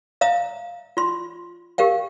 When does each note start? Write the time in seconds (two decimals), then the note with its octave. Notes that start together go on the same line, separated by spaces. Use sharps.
0.21 E5 F5 A#5 D#6
0.97 F4 C6
1.78 G4 A#4 F5 G5